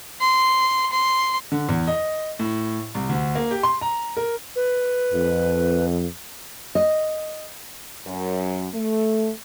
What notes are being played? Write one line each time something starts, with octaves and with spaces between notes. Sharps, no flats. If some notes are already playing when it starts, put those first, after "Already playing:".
C6
C6
D3
E2
D#5
A2
C2
D2
A#3
G4
C6
A#5
A#4
B4
F2
D#5
F#2
A3